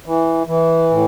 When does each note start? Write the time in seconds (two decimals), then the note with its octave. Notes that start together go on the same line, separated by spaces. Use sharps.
0.06 E3
0.47 E3
0.90 A2